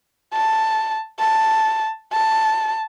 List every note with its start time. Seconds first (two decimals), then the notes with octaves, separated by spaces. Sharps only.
0.34 A5
1.20 A5
2.12 A5